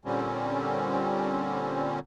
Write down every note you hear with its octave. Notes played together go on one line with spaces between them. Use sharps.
A#2 D3 G3 C4 C#4